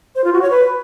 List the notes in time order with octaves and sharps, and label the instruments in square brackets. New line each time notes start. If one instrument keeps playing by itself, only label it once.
[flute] C5
F4
F#4
C#5
B4